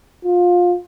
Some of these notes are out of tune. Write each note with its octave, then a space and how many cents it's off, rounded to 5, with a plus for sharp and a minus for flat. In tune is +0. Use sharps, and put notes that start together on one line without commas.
F4 +20